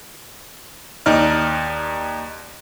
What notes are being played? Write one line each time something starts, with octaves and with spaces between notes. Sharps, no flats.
D#2 D#4 D5 F6